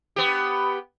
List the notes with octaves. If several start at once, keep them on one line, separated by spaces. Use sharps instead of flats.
B3 G4